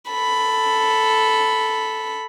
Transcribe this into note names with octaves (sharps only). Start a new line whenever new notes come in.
A4 B5